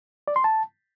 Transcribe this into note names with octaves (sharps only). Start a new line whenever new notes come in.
D5
C6
A5